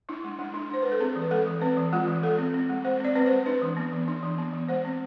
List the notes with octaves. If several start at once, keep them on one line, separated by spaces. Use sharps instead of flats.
D4 E4
G#3
G#3 D4
D4
D4 C5
G#3 B4
A4
C4 G#4
E3
B4
G#3 A4
E3
C4 B4
E3
G#3 F4
E3
G#3 A4
C4
C4
G#3
G#3 C5
C4 D5
C4 B4
G#3 C5
D4 B4
E3
B3
E3
D4
E3
B3
E3
G#3 C5
C4